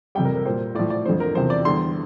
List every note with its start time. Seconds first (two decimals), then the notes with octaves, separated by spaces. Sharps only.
0.15 F2 C3 G3 G5
0.25 A#4
0.36 A#4
0.45 A#2 G3 C5
0.75 A2 F3 D5
0.90 D5
1.05 F2 D3 F3 C5
1.20 A#4
1.35 E2 C3 F3 C5
1.50 D5
1.65 E2 D3 G3 C6